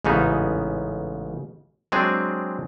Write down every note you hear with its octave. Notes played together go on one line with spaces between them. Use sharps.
A1 G#2 C#3 B3 D#4
F#3 G#3 C4 D4 G#4